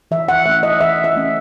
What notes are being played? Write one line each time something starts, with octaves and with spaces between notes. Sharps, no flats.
E3 E5
F#5
A3 C#4 E5
D#5
E3 E5
E5
A3 C#4